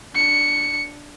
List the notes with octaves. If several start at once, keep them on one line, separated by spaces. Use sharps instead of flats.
D4 C#7